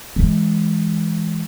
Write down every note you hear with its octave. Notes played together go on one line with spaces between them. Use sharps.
E3 G#3